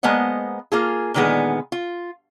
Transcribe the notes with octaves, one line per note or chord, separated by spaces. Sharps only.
G#3 A#3 B3 C5 D#5 F#5
A#3 F4 G#4
A#2 D3 D#3 G#3 B3 G#4
F4